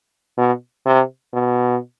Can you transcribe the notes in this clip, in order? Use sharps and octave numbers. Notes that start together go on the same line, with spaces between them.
B2
C3
B2